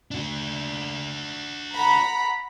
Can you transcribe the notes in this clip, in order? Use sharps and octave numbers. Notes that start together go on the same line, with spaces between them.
D4 F#4
F#5 A#5 B5